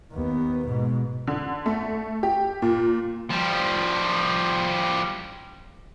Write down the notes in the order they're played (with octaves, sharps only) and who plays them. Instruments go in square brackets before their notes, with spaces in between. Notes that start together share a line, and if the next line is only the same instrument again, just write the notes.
[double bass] D#2 B3
G#2 B2
[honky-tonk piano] D3
A3
G4
A#2
[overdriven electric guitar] F3 G3